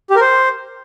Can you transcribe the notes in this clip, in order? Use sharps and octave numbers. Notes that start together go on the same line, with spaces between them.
G4
A#4
C5